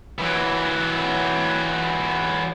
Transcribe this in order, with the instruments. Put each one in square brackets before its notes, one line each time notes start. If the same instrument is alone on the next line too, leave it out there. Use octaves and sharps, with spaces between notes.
[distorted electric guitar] E3 F#3